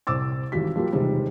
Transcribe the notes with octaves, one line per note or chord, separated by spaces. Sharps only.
C2 C5 D6 E6 A6
G#1 E3 G3 F#4 G4 B6
F3 G3 A#3 F4
E1 C3 D#3 G3 G#3 C4